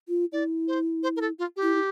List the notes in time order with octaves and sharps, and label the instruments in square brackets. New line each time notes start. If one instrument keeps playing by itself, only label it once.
[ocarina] F4
[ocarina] E4 [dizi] D5
[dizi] C5
C5
A#4
A4
F4
G4
[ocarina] E4
E4